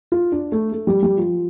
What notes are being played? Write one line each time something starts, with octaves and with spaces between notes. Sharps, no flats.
F4
D4
A3
A3
G3
G3
F3